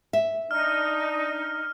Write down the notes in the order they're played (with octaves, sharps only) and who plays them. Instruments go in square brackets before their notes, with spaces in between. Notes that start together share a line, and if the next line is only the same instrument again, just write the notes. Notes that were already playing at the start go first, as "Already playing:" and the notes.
[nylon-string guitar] E5
[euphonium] D4 [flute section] D#4 [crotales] F6